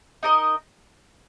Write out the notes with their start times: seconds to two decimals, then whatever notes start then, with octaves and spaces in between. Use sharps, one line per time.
0.23 D#4 A#4 D#5